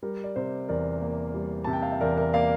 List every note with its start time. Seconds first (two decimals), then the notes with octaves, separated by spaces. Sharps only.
0.03 G3 A#4
0.24 D5
0.36 C3 C5
0.68 E2 A#4 D5
1.02 A#3
1.34 G3
1.64 C3 A5
1.73 G5
1.82 F5
1.92 E5
2.01 E2 A#4 D5
2.17 A#4 D5
2.33 A#3 D5 F5